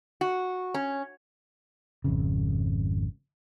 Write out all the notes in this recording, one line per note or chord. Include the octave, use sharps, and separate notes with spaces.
F#4
C#4
G#1 F2 C#3